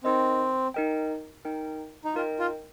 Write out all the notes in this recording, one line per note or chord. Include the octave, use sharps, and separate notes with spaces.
C4 D#4 A#4 D#5 G5
D#4 A#4 D#5 G5
D#4 A#4 D#5 G5
D#4
D#4 F4 A#4 D#5 G5
F4